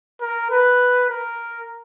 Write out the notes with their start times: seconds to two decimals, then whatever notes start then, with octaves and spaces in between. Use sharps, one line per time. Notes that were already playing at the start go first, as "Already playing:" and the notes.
0.21 A#4
0.51 B4
1.10 A#4